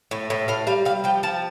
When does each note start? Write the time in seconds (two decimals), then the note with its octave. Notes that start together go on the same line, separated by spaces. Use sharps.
0.11 A2
0.30 A2
0.48 A2 F5
0.67 G3 F5
0.85 G3 F5
1.04 F3 G5
1.23 F3 A5